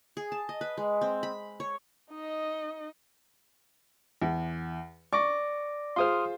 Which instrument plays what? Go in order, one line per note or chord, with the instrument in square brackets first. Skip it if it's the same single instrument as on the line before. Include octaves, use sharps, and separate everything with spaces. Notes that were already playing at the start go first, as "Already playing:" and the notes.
[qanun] G#4
A5
D#5
B4
G#3
C4
B5
C#5
[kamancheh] D#4 D#5
[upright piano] E2
[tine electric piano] D5 D6 A#6 [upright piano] C#6
[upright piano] F4 G#4 C5 [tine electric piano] C6 D#6 F6